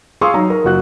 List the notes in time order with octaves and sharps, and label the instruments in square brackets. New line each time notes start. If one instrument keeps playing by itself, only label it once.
[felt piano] G#4 F5 C6 C#6 D#6 E6
F#3 D#4 A#5
A#4
F#1 F#4 F#6